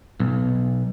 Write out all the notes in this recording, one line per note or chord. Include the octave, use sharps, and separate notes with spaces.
B1